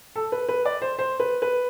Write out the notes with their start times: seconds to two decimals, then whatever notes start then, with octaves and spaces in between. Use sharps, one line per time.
0.16 A4
0.32 B4
0.49 B4
0.65 D5
0.82 C5
0.99 C5
1.20 B4
1.42 B4